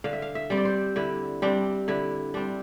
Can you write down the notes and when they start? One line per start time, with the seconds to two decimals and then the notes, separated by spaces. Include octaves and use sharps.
0.04 D3 F5
0.13 E5
0.22 F5
0.35 E5
0.50 G3 C4
0.57 D5
0.65 C5
0.96 D3 E4
1.42 G3 C4 D4
1.88 D3 E4
2.34 G3 C4 D4